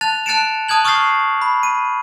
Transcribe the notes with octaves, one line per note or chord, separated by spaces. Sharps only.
A5 F#6 A6 F7
A5 F#6 A6 C#7 D7 E7
A5 D#6 F#6 G#6 F#7
C#6 D#6 F6 G6 A6 C7
B5
D#7